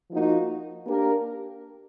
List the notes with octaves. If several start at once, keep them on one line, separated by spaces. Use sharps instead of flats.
F3 A#3 D#4 F#4
A#3 D4 G4 A#4